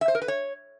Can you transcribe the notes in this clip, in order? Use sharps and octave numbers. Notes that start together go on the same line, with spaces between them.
E5
C5
A#4
B4
C#5